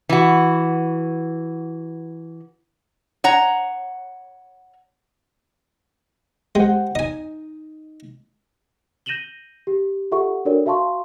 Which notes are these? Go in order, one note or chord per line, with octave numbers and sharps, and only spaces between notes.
E3 F#4
C#5 F#5 A#5
G#3 G4 C5 F#5
D#4 D#5 G#5
G6 A#6 D#7 E7 F#7 G7
G4
F4 G4 A4 E5 F#5 C#6
D4 F#4 A4 A#4 C#5 D5
F#4 E5 F5 A5 C6 C#6